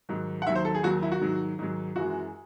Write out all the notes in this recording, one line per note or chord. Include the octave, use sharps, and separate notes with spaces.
G#2 D#3 F#3
F#5
D#2 D#3 F#3 E5
C5
A4
G#4
D#2 D#3 F#3 F#4
E4
F#4
G#2 D#3 F#3
G#2 D#3 F#3
F#2 E3 G#3 F#4